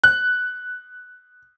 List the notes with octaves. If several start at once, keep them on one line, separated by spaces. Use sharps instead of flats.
F#6